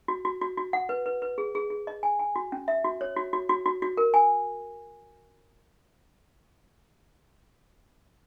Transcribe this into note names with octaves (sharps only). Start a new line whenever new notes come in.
F#4
F#4
F#4
F#4
F#5
B4
B4
B4
G#4
G#4
G#4
D#5
G#5
G#5
F#4
C#4
E5
F#4
C#5
F#4
F#4
F#4
F#4
F#4
A#4
G#5